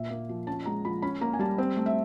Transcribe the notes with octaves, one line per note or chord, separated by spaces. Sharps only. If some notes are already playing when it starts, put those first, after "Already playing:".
Already playing: A#2 E5
A#3
F3
C#4 A5
G#3 A#5
F3 B5
C#4 B5
A#3 A#5
G#5
G3 A5
C4
A3
E5